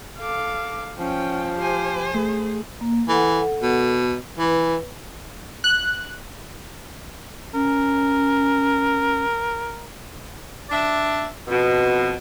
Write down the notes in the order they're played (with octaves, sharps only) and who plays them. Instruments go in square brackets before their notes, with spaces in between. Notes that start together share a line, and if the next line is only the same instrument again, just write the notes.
[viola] A4 D6 [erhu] F5
[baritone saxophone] F3 [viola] C#4 [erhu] G5
[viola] G4 G#5 [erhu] C5
[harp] A3 [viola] G#4
[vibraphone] A#3
[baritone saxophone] E3 [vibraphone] A4 F#5
[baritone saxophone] B2
[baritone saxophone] E3 [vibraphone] B4
[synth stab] F#6
[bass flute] C#4 [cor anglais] A#4
[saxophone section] D4 D5 E5
F2 B2